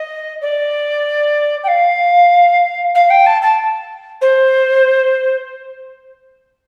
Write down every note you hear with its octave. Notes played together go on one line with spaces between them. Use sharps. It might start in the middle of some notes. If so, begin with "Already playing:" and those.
Already playing: D#5
D5
G5
F5
F5
G5
A5
A5
C5